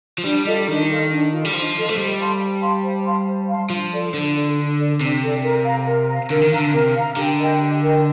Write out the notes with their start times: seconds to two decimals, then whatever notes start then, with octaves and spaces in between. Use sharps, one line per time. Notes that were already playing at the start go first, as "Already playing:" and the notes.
0.18 F3
0.24 G3 D4
0.45 G3 F4 A4 D#5
0.68 D#3 D4
0.89 F4 A4 D#5
1.11 D4
1.32 F4 A4 D#5
1.45 G3
1.53 F3 D4
1.75 F4 A4 D#5
1.89 A3
1.97 G3 C5
2.18 F5 A5 C6
2.40 C5
2.62 F5 A5 C6
2.84 C5
3.06 F5 A5 C6
3.27 C5
3.49 F5 A5 C6
3.70 F3 D4
3.92 A4 D5
4.14 D3 D4
4.35 A4 D5
4.57 D4
4.78 A4 D5
5.00 C3 D4
5.22 A4 D5
5.44 A#4
5.65 F5 A#5
5.86 A#4
6.08 F5 A#5
6.30 D3 A#4
6.42 D#3
6.51 D3 F5 A#5
6.73 C3 A#4
6.95 F5 A#5
7.17 D3 G4
7.38 A#4 D#5 G5
7.60 G4
7.81 A#4 D#5 G5